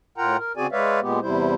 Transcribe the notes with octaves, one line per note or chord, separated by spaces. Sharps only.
A2 F4 A#4 F#5 G5 A#5
A#4
C#3 C4 F#4 G#4 D5 G#5
G#3 B4 C#5 D5 E5 F5
A#2 G#3 B3 G4
E2 C3 G3 E4 C5